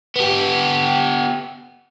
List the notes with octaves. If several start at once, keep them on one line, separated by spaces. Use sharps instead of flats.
B3 G4